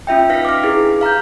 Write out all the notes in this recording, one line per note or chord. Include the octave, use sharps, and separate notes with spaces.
C#4 F4 E5 G5
D#4 B4 F5 A#6 B6
D6 F6
D4 E4 G4 G#4 B4
F5 A#5 F6 G6